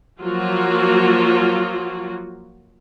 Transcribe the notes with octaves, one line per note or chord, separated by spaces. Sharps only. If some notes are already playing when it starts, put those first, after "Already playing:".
F3 F#3 A#3 F4 F#4